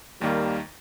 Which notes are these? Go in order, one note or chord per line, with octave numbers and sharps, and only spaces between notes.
D#2 D#3 G3 A#3